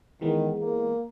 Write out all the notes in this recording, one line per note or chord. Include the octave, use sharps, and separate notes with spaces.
D#3 E3 G#3 B3
A#3